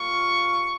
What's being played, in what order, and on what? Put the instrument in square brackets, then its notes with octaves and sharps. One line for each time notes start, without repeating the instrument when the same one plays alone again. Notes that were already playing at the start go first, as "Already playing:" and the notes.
Already playing: [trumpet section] G3 A#3 F4 C#6